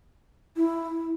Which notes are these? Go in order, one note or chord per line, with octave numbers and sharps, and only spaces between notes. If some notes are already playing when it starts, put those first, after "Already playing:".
E4